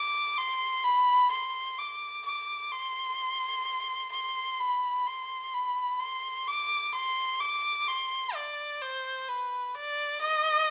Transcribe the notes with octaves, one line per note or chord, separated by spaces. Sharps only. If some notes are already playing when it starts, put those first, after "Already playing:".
Already playing: D6
C6
B5
C6
D6
D6
C6
C6
B5
C6
B5
C6
D6
C6
D6
C6
D5
C5
B4
D5
D#5